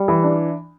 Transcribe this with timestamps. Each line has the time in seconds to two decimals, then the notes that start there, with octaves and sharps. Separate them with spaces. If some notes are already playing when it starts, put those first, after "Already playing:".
Already playing: G3
0.08 E3
0.24 D4